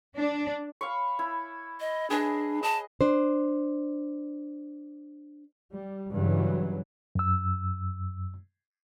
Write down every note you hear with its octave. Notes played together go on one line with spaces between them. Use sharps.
D4
F5 B5 C#6
E4
D#5
D4 G#4 B4 D#5
D#5 A5
D4 C5
G3
G2 C#3 E3 F#3
F#2 E6